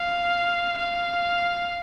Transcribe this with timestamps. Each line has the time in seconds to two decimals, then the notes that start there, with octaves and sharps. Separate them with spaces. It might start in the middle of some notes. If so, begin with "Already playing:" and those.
Already playing: F5
0.77 F5